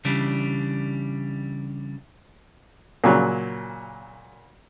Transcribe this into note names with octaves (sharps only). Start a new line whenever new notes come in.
C#3 E3 G3 D4
A#2 C#3 F#3